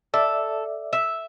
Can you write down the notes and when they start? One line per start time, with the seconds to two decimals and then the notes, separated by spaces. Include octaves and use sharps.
0.14 A4 D5 E5
0.93 E5